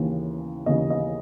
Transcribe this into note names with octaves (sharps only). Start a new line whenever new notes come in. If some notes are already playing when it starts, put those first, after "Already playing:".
Already playing: D#2 C#3 E3
D#2 C#3 E3 D#5
D#5